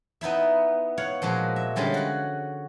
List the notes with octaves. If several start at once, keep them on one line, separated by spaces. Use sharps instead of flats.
B3 D#4 E4 E5
C#5 F5 F#5
A#2 F3 G#3 F#4
E5
D3 G3 G#3 C#4 F4
F#4 F#5